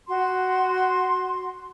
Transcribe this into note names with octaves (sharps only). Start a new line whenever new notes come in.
F#4 C6